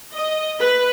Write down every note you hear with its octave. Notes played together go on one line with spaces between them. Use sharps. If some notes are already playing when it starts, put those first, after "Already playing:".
D#5
B4